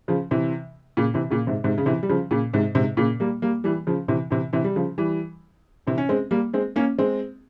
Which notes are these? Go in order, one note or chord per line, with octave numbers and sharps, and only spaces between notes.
C#3 F3
C3 E3
A#2 C#3
C3 E3
A#2 C#3
G#2 C3
G#2 C3
C#3
C3 E3
G3
C#3 F3
A#2 C#3
G#2 C3
G#2 C3
A#2 C#3
G3 A#3
G3 A#3
E3 G3
C#3 F3
C3 E3
C3 E3
C3 E3
G3
C#3 F3
E3 G3
C3 E3
C#4
G#3 C4
G3 A#3
G#3 C4
A#3 C#4
G#3 C4